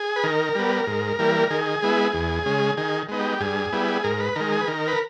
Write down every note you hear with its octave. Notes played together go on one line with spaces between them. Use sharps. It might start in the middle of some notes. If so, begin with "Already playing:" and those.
Already playing: G#4
B4
D#3 A#4
G3 B3
G#2
E3 G3 A#3
D#3 G#4
G#3 B3 E4
E2
C#3 G#3
D#3 G#4
G#3 B3 D#4
G4
G2 G#4
G3 B3 E4
G#2 A#4
B4
D#3 G#3 A#4
G#4
B4
D#3 A#4
B4